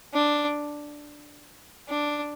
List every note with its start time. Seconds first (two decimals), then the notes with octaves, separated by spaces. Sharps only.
0.14 D4
1.88 D4